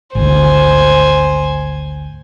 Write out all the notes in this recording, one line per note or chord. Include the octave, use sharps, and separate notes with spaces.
G#1 D2 C5 G#5